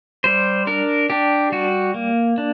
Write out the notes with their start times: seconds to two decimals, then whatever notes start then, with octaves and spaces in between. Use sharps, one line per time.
0.24 G3 C5
0.67 D4 A#4
1.10 D4 G4
1.52 G3 F#4
1.94 A#3
2.38 D4